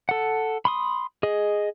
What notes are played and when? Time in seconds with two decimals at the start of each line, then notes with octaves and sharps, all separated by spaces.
0.09 A4 F#5
0.65 B5 C6 D#6
1.23 G#4 D#5